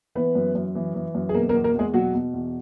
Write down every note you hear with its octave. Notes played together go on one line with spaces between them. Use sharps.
E3 B3 B4
F#2
F#2
E3
E3
F#2
G#4
B2 A#3 A#4
A#3 A#4
E2
A#3 A#4
E2 G#3 G#4
B2 F#3 F#4
B2
E2